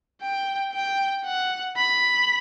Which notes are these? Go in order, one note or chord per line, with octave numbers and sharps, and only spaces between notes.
G5
G5
F#5
B5